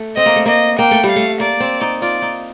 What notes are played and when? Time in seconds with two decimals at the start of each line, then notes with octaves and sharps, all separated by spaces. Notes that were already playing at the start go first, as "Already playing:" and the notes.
Already playing: A3
0.16 C4 D#5
0.26 A#3
0.36 A3
0.46 A#3 D#5
0.79 A#3 G5
0.91 A3
1.04 G3
1.09 F5
1.16 A3
1.40 A#3 D5
1.60 C4
1.81 D#4
2.02 F4 D5
2.22 D#4